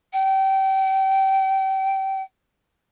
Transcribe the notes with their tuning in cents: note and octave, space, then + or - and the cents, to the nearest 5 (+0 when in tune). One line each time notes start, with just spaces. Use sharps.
G5 -30